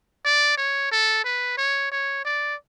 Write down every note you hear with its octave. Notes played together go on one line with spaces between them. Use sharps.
D5
C#5
A4
B4
C#5
C#5
D5